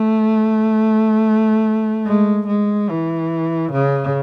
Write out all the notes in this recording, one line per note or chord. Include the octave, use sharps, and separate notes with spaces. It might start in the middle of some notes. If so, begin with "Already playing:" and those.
Already playing: A3
G#3
G#3
E3
C#3